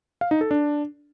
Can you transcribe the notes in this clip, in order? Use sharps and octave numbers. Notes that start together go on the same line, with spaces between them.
F5
D#4
A4
D4